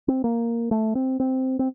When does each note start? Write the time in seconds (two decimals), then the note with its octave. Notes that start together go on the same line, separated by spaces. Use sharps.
0.08 C4
0.24 A#3
0.71 A3
0.95 C4
1.20 C4
1.59 C4